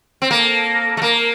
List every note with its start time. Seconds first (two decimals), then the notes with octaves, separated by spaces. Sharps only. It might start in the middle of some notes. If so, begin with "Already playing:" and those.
0.22 C4
0.30 A#3 A4
0.97 A3
1.02 A#3 A#4